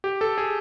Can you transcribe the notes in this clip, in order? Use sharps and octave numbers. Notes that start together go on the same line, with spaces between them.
G4
A4
G#4